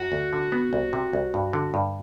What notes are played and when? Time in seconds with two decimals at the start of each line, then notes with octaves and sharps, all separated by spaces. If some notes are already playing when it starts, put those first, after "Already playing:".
Already playing: F#2 F#4
0.12 D2
0.33 D3
0.52 B3
0.73 C2
0.93 C3
1.13 C2
1.34 G2
1.53 D3
1.74 G2